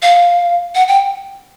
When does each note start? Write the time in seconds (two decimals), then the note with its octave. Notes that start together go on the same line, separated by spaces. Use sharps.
0.02 F5
0.75 F#5
0.88 G5